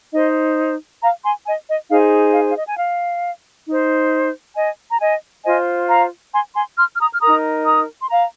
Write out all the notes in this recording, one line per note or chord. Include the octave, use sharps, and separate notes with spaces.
D#4 C5 D#5
F5 A#5
G#5 C6
D#5 G#5
D#5
D#4 G#4 C5 F5
F5
F5
D#5
G#5
F5
D#4 C5
D#5 G#5
A#5
D#5 G#5
F4 C5 D#5 G#5
F5 A#5
G#5 C6
G#5 C6
C6 F6
F6
A#5 D#6
F6
D#4 A#4 A#5 D#6
A#5 D#6
C6
F5 A#5